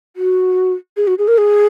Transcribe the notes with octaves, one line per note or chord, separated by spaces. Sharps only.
F#4
G#4
F#4
G#4
A#4
G#4